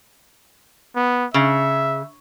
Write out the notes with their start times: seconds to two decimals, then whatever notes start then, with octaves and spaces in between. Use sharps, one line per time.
0.95 B3
1.34 C#3 E5